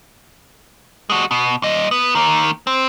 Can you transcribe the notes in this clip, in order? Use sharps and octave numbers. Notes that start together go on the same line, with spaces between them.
G#3 F#4
B2
A#2 D#5
B3
D#3 A#3
C4